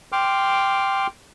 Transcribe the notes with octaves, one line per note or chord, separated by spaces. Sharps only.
G5 C6 D6 F6